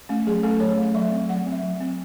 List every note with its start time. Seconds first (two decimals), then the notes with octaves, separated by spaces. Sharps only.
0.09 A3 C#4
0.27 F#3 G#4
0.43 A3 C#4 A4
0.60 F#3 C#5
0.78 A3 C#4
0.94 F#3 E5
1.12 C4
1.29 F#3 F#5
1.47 C4 E5
1.63 F#3
1.81 C4